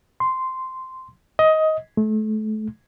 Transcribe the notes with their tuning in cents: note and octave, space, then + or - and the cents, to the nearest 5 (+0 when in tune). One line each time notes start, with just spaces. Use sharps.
C6 -10
D#5 +15
A3 -30